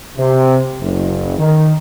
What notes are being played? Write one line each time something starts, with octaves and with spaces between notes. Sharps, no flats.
C3
F#1
D#3